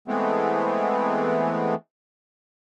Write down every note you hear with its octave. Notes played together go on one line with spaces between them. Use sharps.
E3 G#3 A3 B3 C4